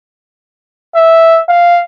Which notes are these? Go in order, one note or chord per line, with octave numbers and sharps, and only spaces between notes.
E5
F5